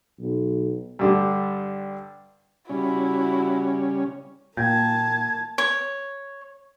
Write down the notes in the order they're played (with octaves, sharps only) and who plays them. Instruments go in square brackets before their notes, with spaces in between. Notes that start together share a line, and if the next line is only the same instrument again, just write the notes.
[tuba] B1
[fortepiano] G2 D3 G3
[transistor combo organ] C#3 G3 C#4 [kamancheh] E4 F#4
[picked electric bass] A#2 [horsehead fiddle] A#3 A5 [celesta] G5 G6 [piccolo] G#6
[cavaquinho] C#5